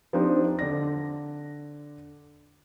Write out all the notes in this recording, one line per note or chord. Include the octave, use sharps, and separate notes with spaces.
F3 C4 D4 D#4 G4
D3 D5 A#6